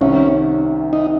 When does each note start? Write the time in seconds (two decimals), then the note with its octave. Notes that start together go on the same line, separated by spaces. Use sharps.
0.01 C2 C3 D#3 C#4
0.93 D#4